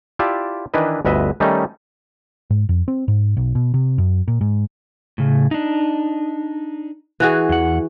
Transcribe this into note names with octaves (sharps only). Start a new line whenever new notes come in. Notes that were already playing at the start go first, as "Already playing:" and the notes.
E4 F4 G4 D5 E5 A5
D#3 E3 D4 E4 B4 D#5
G1 D2 B4 D#5 E5
D#3 G3 A3 C#4 D#4
G#2
F2
C4
G#2
B1
B2
C3
F#2
A#2
G#2
A2 C#3
D4 D#4
E3 F#4 G#4
E2 F#5